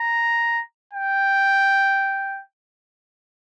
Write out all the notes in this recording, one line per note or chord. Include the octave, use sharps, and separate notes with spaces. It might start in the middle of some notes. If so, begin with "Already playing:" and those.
Already playing: A#5
G5